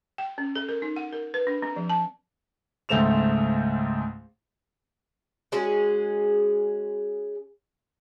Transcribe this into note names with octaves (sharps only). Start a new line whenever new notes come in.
G5
C#4
A4
A#4
D#4
F#5
A#4
B4
D4
C4
F3
A5
C#2 G#2 A3 C4 E7 F7
G#3 C#4 F#4 G#4